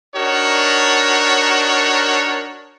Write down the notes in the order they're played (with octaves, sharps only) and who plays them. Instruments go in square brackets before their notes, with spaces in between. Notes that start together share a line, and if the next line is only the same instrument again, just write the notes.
[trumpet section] D4 D#4 F#4 A#4 C#5